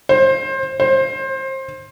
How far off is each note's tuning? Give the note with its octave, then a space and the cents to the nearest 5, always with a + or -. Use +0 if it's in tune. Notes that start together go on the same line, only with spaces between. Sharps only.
C5 +25
C5 +25